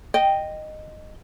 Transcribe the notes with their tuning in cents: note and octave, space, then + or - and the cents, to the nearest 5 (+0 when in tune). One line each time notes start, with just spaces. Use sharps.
D#5 -10 G5 +0